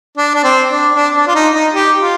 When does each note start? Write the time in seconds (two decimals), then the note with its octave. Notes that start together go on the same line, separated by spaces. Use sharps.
0.17 D4
0.35 D4
0.44 C4
0.69 D4
0.95 D4
1.16 D4
1.28 F4
1.35 D#4
1.54 D#4
1.74 G4
2.00 F4